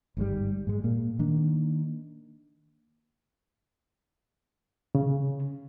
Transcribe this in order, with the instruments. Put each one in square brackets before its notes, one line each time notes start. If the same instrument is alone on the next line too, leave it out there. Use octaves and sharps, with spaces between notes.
[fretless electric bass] G1 G#2 C3 G3
G#2 G#3
A#2 A#3
D#3 A#3 D4
[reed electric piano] C#3